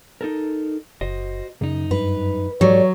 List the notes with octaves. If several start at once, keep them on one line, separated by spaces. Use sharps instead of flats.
D#4 A4 A#4
F#1 F#4 C5 D#5
F#2 C#3 D#4
G2 B4
G#2 F#3 G4 A4 C#5 D5